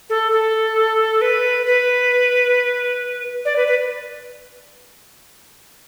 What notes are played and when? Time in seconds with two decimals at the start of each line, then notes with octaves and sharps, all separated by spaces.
0.10 A4
0.32 A4
1.22 B4
1.66 B4
3.45 D5
3.56 B4
3.68 B4